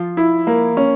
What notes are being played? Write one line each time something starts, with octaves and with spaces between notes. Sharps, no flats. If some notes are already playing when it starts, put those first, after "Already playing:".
Already playing: F3 F4
E4
A#3
C#4